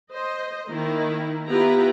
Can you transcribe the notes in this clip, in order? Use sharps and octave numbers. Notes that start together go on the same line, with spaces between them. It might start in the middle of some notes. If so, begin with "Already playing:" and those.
C5 D#5
D#3 A#3 E4 A#4
B3 E4 F4 G4 B4 A#5